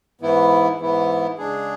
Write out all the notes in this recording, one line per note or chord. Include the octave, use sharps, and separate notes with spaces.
G#2 E3 B3 E4
G#2 E3 B3 E4
C#3 G#3 D4 G#4